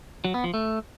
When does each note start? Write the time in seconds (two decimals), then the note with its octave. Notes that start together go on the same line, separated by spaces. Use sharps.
0.25 F#3
0.34 B3
0.44 F3
0.54 A3